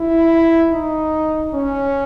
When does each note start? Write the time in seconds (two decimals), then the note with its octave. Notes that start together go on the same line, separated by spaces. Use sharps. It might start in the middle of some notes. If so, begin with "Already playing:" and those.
Already playing: E4
0.72 D#4
1.54 C#4